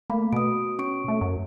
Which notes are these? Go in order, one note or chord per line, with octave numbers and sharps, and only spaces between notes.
A3 A#3 B5
B2 D#6 D7
C#4 C#6 D7
A3
F#2